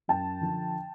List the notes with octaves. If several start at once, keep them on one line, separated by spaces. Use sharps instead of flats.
F#2 G5 A5
D3 F3